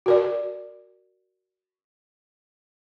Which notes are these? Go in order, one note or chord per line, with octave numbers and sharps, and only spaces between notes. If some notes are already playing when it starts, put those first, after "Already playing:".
F#4 A#4 D5